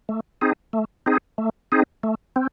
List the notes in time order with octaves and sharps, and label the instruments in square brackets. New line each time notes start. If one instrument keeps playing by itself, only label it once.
[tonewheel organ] A3
C4 D#4 G#4
A3
C4 D#4 G#4
A3
C4 D#4 G#4
A3
C4